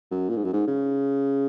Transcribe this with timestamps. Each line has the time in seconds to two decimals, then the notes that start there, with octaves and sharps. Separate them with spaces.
0.11 F#2
0.29 A#2
0.37 G#2
0.44 F#2
0.53 G#2
0.67 C#3